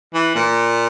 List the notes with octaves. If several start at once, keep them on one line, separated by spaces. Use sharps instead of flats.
E3
A#2